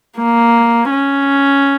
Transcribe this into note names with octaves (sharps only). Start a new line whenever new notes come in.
A#3
C#4